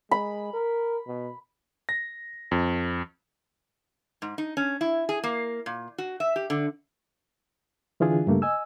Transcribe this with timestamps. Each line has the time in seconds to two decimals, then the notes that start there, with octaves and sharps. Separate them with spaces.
0.11 G#3 B5
0.53 A#4
1.07 B2
1.89 A#6
2.51 F2
4.22 G#2
4.38 D#4
4.57 C#4
4.81 E4
5.09 G#4
5.24 A#3
5.66 A#2
5.98 F#4
6.20 E5
6.36 G4
6.50 D3
8.00 D3 E3 D4 F4 G#4
8.27 G2 C#3 A3 A#3
8.42 D#5 G#5 E6